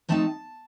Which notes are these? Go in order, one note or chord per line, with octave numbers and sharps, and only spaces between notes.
F3 A3 C4 D#4 A5